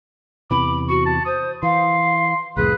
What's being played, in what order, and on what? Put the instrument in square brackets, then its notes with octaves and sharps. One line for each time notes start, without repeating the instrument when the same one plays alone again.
[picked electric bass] E2 C3 E3 [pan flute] B5 [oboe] D6
[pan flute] F#4 [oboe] C#6
[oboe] A5
[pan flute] C5 [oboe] D#6
[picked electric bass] E3 [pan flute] F5 [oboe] C6
[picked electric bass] C2 F2 A2 [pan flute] G#4 [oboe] B4